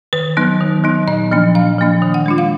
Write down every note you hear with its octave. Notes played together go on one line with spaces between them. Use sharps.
D#3 B4
F#3 B3 D#4
D#3
F#3 B3 D#4
A#2 D#5
F3 A#3 D4
A#2 F5
F3 A#3 D4
D#3
F#5
G#3 D4 F4
F5